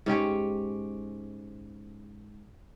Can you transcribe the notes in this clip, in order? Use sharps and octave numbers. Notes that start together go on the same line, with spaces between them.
G#2 C#4 G4 C#5